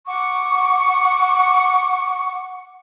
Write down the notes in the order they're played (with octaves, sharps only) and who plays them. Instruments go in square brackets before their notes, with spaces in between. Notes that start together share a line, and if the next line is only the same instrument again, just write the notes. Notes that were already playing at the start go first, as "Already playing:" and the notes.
[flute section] F#5 C#6 D6